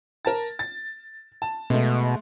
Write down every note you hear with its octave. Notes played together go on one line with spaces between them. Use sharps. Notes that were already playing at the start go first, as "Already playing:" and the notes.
A#4 A5 A6
A6
A5
B2 G#3 A3